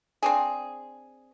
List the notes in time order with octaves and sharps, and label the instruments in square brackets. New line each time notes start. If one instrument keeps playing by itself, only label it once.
[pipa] C4 D4 G#4